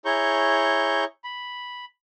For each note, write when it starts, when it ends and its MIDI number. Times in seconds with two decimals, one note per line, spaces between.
0.05 1.04 64
0.05 1.04 68
0.05 1.04 73
0.05 1.04 82
0.05 1.04 85
0.05 1.04 91
1.24 1.85 83